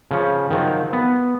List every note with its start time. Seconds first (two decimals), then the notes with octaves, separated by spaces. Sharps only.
0.11 C#3 F3 C#4
0.50 D#3 F3 F#3
0.93 B3